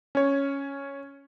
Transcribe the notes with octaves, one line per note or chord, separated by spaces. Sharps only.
C#4 C#5